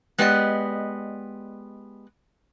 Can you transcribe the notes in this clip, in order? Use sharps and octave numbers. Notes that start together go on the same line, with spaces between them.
G#3 B3 G4 D5 D#5